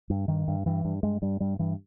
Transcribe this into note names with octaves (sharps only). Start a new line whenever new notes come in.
G2
G2 D#3
G2
G2 E3
G2
G2 G#3
G2 G3
G2 G3
G2 E3